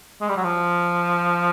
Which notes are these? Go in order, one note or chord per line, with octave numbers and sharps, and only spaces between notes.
G#3
G3
F#3
F3